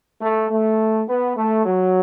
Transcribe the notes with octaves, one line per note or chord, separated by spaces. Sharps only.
A3
A3
B3
A3
F#3